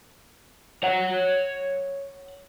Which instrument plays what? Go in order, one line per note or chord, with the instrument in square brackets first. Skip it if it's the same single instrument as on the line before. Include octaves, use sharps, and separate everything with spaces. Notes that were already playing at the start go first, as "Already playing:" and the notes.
[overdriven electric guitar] C#5 F#5